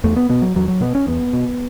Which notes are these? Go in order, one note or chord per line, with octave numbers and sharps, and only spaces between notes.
E2 A3
B3
B2 B3
F#3
E2 F#3
F#3
B2 B3
C#4
E2 B3
B2